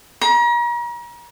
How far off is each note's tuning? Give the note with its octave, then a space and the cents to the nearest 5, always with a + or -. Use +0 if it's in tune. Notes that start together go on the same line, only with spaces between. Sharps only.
A#5 +40